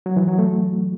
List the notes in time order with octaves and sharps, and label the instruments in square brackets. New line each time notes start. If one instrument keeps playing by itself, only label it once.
[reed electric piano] F#3
E3
F#3
A3